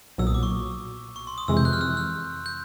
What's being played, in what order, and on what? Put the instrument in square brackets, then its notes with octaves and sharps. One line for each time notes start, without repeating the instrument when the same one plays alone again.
[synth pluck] B1 A#2 F#3 [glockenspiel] E6
[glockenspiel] D#6
D6
C#6
C#6
C6
D#6
[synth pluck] F2 C3 E3 G#3 [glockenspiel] E6
[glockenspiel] G6
F#6
F6
E6
F6
G6